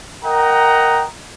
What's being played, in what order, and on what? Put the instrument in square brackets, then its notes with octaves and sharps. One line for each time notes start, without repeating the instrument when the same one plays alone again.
[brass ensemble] A#4 D#5 F#5 G5 A#5